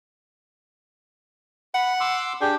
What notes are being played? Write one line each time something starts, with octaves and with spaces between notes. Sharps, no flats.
F#5 B5
C6 D6 E6
D4 G4 G#4 G5